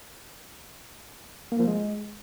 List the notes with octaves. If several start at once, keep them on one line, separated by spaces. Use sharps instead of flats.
A#3
F3
G#3